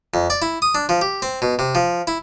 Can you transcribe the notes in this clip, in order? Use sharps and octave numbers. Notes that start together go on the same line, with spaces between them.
F2
D5
E4
D#6
D4
F3
G4
C4
B2
C3
F3
E4